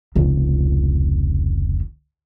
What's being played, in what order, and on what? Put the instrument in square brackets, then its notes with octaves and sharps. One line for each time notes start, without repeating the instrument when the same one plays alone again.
[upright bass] F1 C#2